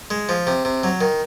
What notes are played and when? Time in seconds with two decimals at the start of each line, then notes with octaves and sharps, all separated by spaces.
0.11 G#3
0.29 F3
0.47 C3
0.65 C3
0.84 F#3
1.01 D#3